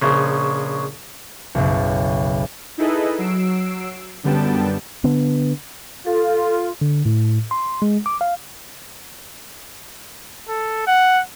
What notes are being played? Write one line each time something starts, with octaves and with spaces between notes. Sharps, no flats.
A#1 C#3
F#1 B1
D#4 E4 G#4 A4 B4 D#5
F#3 E6 C7 D7
F#2 D3 G3 B3 G5 A5
D3 B3
F4 A4
D3
A2
C6
G#3
D6
F5
A4
F#5